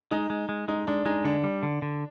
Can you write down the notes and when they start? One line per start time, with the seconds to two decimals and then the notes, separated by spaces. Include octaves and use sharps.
0.11 G#3 D#4
0.30 G#3
0.49 G#3
0.68 G#3 D#4
0.87 G#3 D4
1.06 G#3 D#4
1.25 D3 D4
1.44 G3
1.63 D3
1.82 D3